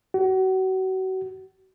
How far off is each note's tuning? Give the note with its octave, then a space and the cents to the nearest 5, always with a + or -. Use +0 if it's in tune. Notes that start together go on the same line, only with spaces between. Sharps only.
F#4 +30